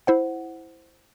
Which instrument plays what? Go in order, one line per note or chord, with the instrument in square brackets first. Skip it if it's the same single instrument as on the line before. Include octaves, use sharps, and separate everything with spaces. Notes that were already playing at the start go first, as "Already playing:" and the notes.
[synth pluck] E4 C5 F#5